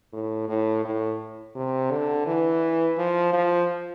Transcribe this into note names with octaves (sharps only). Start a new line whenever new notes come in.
A2
A2
A2
C3
D3
E3
F3
F3